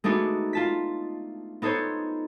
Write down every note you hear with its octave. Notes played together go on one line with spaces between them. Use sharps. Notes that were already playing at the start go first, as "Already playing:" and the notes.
G#3 A3 B3 D4 D#4 F#4
F4 A5 B6
B3 D#4 A4 C5 C#5